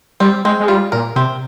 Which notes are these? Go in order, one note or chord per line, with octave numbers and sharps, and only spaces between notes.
G3 C4
G#3 C4
G#3
G3 F4
A#2 A#4
C3 C4